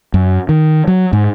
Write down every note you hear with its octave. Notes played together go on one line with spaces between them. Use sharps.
F#2
D#3
F#3
G#2